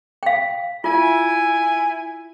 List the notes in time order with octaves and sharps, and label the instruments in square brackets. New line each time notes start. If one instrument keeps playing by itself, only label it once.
[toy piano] F5 G5
[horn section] E4 G#5 [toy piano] F4